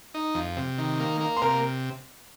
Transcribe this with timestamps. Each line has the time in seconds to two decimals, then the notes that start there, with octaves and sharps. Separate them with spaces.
0.14 D#4
0.34 F2
0.57 C3
0.78 D#3
1.00 A#3
1.21 A#3
1.37 C6
1.42 C3 A#4 A#5